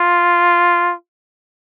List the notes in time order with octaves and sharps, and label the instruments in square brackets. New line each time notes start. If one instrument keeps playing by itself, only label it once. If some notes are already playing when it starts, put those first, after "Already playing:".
Already playing: [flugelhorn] F4